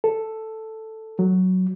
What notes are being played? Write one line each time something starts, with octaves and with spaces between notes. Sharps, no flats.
A4
F#3